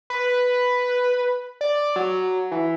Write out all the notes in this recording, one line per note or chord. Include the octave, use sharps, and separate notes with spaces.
B4
D5
F#3
E3